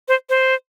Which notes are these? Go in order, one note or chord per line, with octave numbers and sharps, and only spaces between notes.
C5
C5